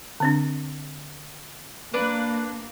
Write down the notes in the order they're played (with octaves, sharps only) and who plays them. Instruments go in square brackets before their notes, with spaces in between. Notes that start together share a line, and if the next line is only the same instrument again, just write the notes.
[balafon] D3 C4 D4
[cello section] A#3 [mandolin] D4 B4